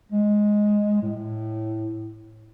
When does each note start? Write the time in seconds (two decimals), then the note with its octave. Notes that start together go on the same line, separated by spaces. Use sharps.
0.12 G#3
1.02 A2